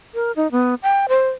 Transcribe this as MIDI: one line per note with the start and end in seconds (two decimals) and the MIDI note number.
0.14 0.32 70
0.36 0.50 63
0.52 0.75 59
0.83 1.06 79
1.09 1.29 72